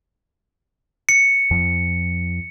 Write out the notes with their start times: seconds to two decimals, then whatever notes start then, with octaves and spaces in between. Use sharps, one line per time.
1.09 C#7
1.51 F2 F3